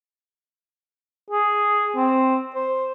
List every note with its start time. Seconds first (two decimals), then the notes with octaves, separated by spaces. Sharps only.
1.30 G#4
1.96 C4
2.55 C5